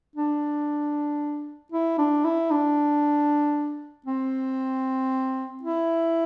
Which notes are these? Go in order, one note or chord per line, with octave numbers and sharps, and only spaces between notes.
D4
E4
D4
E4
D4
C4
E4